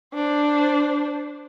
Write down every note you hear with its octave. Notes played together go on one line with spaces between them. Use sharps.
D4 C5